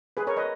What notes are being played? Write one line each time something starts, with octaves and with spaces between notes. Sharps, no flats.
G#4 B4
A#4 C#5
B4 D#5